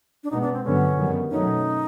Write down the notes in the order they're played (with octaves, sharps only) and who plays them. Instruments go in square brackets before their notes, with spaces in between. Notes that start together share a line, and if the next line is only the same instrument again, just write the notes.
[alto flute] D4
[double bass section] B2 G#3 B3 [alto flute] D#4
[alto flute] D4
C4
[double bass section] G2 D3 F#3 B3 [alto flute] C#4
[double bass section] F#2 D#3 G3 B3
[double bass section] B2 F#3 A3 C#4 [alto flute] D#4